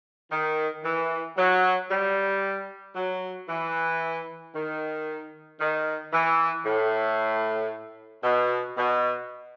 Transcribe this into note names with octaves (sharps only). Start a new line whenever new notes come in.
D#3
E3
F#3
G3
F#3
E3
D#3
D#3
E3
A2
B2
B2